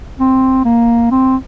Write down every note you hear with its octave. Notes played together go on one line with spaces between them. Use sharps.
C4
A#3
C4